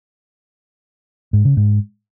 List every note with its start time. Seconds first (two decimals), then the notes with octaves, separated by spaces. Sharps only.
1.33 G#2
1.45 C#3
1.57 G#2